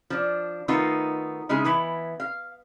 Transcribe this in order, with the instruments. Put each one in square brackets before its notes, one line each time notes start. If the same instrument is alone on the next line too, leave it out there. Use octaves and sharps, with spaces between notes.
[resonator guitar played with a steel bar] F3 D4
D#3 A3 B3 D#4 F4
C#3 G#3 D#4 E4 G#4
E3 B3 E4
F5